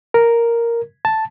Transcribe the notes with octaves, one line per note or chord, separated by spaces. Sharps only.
A#4
A5